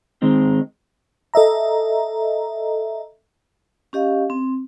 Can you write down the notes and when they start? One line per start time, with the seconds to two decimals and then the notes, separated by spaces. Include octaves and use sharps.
0.22 D#3 G#3 C4 D#4
1.34 A4 D#5 E5 A#5
3.93 C#4 G4 D#5 F5
4.30 C4